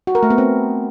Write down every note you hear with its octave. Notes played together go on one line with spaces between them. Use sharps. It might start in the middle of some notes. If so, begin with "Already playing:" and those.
F#4
A#4
A3
B3
C4